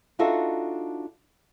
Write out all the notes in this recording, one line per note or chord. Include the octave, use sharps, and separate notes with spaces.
D4 D#4 F4 F#4 A4 E5